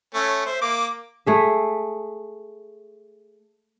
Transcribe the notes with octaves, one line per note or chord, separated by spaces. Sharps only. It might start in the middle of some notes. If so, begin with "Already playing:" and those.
A3 C#4
C5 E5
A#3 D6
A3 G#4 E5